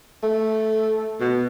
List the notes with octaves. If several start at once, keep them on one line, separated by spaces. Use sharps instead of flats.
A3
B2